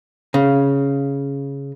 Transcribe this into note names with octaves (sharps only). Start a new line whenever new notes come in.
C#3